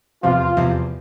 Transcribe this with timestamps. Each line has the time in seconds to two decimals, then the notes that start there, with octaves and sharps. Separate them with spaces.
0.23 E2 C3 F3 F4
0.57 E2 C3 F3